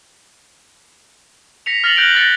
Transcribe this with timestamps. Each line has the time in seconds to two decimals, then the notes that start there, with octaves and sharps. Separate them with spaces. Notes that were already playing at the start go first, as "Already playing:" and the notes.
1.66 A#6 B6 C#7 F7
1.84 F6 A6 A#6 C7 F7 F#7
1.96 F#6 G6 A#6 D7 F#7 G7
2.15 F6 A6 A#6 C#7